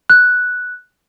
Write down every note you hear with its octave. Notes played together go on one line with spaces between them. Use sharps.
F#6